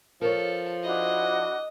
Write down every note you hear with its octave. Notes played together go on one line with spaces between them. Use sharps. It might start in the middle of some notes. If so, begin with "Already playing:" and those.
F3 A4 A#4 C#5
D4 E4 F#4 D#5